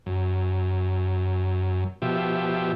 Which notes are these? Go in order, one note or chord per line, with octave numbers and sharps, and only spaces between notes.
F#2
B2 F3 G4 E5